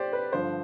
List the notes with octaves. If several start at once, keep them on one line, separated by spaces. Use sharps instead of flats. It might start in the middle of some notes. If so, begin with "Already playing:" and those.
Already playing: G4 C5 D5
B4
G2 D3 F3 C5